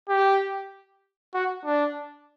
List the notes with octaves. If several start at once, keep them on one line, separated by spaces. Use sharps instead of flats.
G4
F#4
D4